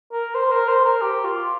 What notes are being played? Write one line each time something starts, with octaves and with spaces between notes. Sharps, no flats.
A#4
C5
A#4
C5
A#4
G4
F4